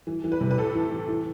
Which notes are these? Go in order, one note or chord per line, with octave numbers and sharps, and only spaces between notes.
E3
E3
B4
C3
B4
A2 A4
E3
E3
E3